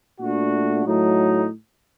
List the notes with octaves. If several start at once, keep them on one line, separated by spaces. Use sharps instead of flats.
A#2 A3 D4 F#4
A2 F#3 A3 D#4